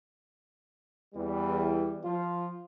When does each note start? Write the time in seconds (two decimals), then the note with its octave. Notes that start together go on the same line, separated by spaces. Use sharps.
1.14 E2 E3 G3
2.04 F3 F4